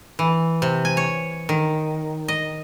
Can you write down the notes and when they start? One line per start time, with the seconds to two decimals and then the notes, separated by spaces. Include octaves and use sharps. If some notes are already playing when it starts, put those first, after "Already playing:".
0.19 E3
0.62 C3
0.85 G#5
0.97 C#5
1.49 D#3
2.28 D#5